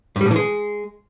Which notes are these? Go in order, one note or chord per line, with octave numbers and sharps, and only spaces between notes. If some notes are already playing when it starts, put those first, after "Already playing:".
G2
G3
A2
E3
G#3